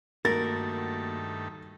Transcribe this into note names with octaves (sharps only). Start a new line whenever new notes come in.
G2 D#3 A3 A#3 F#4 A#4 A6